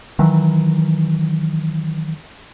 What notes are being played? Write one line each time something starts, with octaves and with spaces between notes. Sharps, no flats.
D#3 E3 F#3